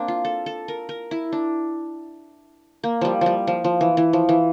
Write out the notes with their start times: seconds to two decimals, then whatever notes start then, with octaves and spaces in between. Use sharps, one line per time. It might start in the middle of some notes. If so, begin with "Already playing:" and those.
Already playing: A#3 C4 D4
0.08 F4
0.25 A4
0.46 A4
0.68 A#4
0.89 A#4
1.11 E4
1.32 D4
2.83 A#3
3.01 F3 G3
3.21 F3 G3
3.47 F3
3.64 F3
3.81 E3
3.97 E3
4.13 F3
4.29 E3